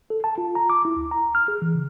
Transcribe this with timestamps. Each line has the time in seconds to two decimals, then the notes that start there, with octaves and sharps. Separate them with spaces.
0.10 A4
0.24 A5
0.38 F4
0.55 A#5
0.70 D6
0.85 E4
0.96 D2
1.11 A#5
1.35 F6
1.48 G#4
1.62 E3
1.74 C#3